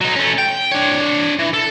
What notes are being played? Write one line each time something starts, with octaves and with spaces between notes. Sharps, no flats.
F#3 D#4
A3 C#4
G5
D4 C#5
E3
A4